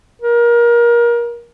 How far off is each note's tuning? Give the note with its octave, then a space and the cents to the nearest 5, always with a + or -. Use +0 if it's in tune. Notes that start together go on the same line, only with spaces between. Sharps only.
A#4 +25